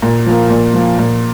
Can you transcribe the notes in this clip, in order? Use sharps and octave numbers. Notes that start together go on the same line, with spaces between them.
A#2
F3 A#3
A#2
F3 A#3
A#2